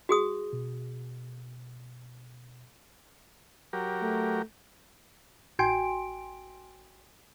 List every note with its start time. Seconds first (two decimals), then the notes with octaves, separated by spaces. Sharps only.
0.09 F#4 G#4 D#6
0.53 B2
3.73 F#3 G4 A#4
4.02 A3
5.59 A1 F#4 G5 G#5 C6 D7